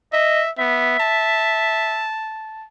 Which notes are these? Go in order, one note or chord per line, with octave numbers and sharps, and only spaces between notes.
D#5 E5
B3 E5
A5